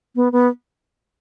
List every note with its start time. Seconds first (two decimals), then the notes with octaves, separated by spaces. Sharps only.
0.15 B3
0.32 B3